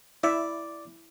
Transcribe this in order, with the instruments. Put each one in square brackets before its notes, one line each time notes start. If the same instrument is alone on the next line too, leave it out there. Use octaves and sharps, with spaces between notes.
[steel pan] E4 E5 [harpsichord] D5